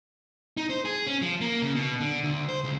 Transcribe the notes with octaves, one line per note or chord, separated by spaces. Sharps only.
D#4
C5
G#4
C#4
F3
A#3
C#3
B2
D3
D2
C5
C#2